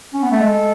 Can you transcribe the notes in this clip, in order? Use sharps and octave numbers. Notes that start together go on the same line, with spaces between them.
C#4
B3
A3
G#3 A4